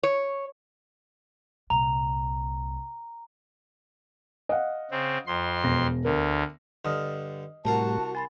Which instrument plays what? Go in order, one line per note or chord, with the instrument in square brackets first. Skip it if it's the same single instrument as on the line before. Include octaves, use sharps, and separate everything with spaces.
[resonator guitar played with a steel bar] C#5
[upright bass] C2 A#2 [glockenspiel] A#5
[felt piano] D#5 F5 F#5
[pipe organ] C#3 C4
F2 C6
[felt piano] E1 A#6
[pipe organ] D2 D3 [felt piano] A#4
[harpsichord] G2 D3 [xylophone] D#5 D#6 F6
[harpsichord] C2 A#4 F5 [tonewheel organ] A2 G3 [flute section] F#4 A5
[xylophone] G#5 B5 A6 [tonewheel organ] A5 C6